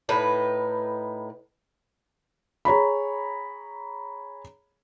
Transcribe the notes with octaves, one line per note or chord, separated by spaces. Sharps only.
A2 D#4 B4
G#4 C#5 A#5 B5